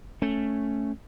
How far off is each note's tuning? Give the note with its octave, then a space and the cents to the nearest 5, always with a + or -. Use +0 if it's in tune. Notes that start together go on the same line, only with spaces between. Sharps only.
A3 +0 C#4 +0